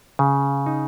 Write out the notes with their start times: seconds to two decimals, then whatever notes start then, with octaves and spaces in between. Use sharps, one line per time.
0.19 C#3
0.66 D#4